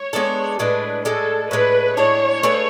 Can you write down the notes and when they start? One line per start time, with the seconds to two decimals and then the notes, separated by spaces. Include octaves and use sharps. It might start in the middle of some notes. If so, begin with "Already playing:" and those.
Already playing: C#5
0.13 G#3 B3 D4 A4
0.59 A2 G#3 D4 B4
1.05 A2 G#3 D4 A4
1.51 A2 G#3 D4 B4
1.97 A2 G#3 D4 C#5
2.43 A3 D4 G#4 B4